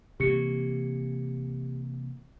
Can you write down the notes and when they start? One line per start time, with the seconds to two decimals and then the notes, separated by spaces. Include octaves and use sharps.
0.20 C3 E3 A#3 G4 C#7